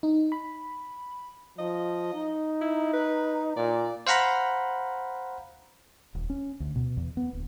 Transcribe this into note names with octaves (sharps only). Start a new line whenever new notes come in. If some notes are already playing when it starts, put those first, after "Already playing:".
D#4
B5
F3 D#5
D#4
E4
B4
A#2 D5
C5 F5 F#5 A#5 B5
D#1
C#4
D2
B2
E2
B3
D1